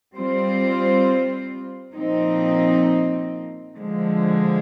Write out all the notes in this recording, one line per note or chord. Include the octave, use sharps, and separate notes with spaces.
G3 C4 F4 C5
A#2 F3 C4 D#4
D3 F3 G#3